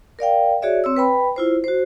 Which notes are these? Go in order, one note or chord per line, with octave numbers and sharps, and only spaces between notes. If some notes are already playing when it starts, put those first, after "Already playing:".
A#4 D5 F5 G5
F#4 G#4 C#5 D5 E5
C4 C#5 E6
B4 G5 B5
E4 F4 C5
F#4 C5